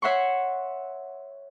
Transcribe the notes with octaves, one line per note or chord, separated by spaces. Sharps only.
C#5 E5 F#5 C6 C#6